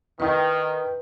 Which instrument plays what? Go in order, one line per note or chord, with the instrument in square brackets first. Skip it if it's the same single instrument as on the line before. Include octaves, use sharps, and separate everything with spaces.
[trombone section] D#3 [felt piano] E4 D#5 G5 [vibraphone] B4